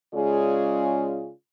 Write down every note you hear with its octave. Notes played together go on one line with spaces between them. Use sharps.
C#3 G#3 C#4 F4 G#4 D5